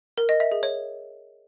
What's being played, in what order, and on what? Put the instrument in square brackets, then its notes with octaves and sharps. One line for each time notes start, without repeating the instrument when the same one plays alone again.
[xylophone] A#4
D#5
E5
G#4
C#5